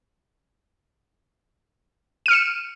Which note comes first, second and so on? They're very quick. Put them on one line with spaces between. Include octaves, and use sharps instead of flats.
D#7 F6 C#7 E7